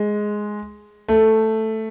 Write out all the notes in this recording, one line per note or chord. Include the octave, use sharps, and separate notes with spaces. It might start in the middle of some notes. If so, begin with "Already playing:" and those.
Already playing: G#3
A3